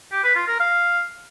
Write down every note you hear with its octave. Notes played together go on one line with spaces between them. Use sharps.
G4
B4
F4
A#4
F5